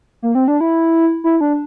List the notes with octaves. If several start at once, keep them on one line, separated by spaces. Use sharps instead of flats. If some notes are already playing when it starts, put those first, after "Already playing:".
A#3
C4
D4
E4
E4
D4